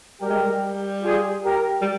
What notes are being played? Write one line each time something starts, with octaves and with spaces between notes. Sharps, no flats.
G3 G4 A#4
G#3
G3
F4 G#4
G4 A#4
G3